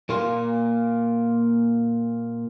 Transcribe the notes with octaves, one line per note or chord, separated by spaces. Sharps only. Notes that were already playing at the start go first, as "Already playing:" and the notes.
A#2 A#3 F4